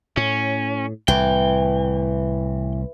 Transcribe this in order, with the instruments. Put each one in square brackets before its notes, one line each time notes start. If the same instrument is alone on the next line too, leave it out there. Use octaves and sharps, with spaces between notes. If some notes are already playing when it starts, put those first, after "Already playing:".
[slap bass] A2 [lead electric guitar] C#4
[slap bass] C2 A2 [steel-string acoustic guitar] E3 [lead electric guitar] G5